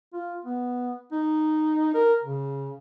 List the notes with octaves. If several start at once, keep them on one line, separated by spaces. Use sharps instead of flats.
F4
B3
D#4
A#4
C#3